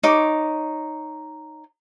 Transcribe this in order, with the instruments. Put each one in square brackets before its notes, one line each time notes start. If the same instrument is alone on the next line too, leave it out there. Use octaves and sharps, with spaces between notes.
[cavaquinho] D#4 C#5 D6